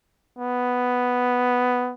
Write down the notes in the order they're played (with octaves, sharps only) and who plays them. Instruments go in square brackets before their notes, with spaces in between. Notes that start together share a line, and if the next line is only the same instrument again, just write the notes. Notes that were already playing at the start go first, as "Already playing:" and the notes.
[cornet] B3